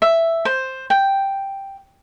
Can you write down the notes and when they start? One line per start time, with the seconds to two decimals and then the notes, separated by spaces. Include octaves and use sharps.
0.02 E5
0.45 C5
0.90 G5